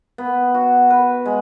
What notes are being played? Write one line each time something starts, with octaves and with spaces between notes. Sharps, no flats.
B3
F#4
B4
G#3